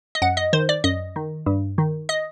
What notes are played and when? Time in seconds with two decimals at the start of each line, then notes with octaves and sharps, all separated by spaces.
0.15 D#5
0.22 F#2 F#5
0.37 D#5
0.53 D#3 C5
0.69 D5
0.84 F#2 D#5
1.16 D#3
1.46 G2
1.78 D#3
2.09 D#5